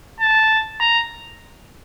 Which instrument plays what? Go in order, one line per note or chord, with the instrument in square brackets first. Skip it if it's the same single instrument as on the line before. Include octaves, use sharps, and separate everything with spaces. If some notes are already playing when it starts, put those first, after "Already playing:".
[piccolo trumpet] A5
A#5